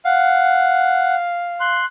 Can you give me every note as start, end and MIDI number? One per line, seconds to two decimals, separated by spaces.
0.05 1.80 77
0.05 1.15 78
1.60 1.85 84
1.60 1.85 90